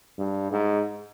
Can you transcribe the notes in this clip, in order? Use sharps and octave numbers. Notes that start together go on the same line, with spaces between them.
G2
G#2